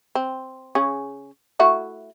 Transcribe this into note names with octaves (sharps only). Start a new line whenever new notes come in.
C4
C#3 C#4 G#4
A3 E4 F#4